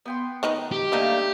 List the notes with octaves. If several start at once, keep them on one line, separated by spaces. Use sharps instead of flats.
B3 G5 C6
D#3 D#4 B4
G4
G3 A3 A#3 D4 D#4